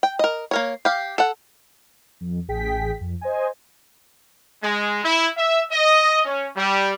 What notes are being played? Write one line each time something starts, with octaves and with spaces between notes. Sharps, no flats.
G5
A#4 D#5
A#3 A#4 C#5
G4 F5
A4 F#5
F2
A1 G#4 G5 B6
F2
C5 D#5 G#5
G#3
E4
E5
D#5
C#4
G3